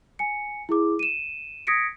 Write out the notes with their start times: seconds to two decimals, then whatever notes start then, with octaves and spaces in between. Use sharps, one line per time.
0.19 G#5 C#7
0.69 E4 G#4 D6
0.99 D#7 E7
1.67 D#6 G#6 A#6 B6 C#7 D7